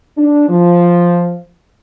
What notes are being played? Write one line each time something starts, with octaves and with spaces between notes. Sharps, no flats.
D4
F3